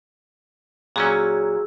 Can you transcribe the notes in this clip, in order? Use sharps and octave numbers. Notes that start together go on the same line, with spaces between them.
A#2 F#3 C#4 F#4 G#4 E6